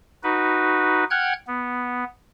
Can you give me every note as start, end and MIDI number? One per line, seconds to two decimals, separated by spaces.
0.23 1.04 63
0.23 1.04 66
0.23 1.04 71
1.11 1.33 78
1.11 1.33 79
1.11 1.33 89
1.11 1.33 90
1.11 1.33 92
1.47 2.04 59